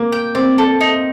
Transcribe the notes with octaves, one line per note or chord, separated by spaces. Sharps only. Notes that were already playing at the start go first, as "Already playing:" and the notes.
Already playing: A#3
G5
C4 D5
A4
D#4